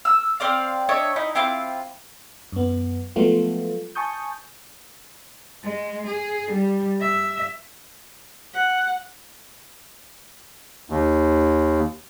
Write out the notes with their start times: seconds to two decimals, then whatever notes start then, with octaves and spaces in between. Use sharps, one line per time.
0.05 E6
0.40 C4 C5 D5 F5
0.89 D4 C#5 D#5 E5
1.16 D#4 E4
1.35 C4 E4 F4 D6
2.52 F#2 B3
3.16 F3 F#3 G#3 A3 B3 F4
3.95 G#5 A5 C#6 D#6 G6
5.64 G#3
6.07 G#4
6.51 G3
7.00 E5
8.54 F#5
10.90 D#2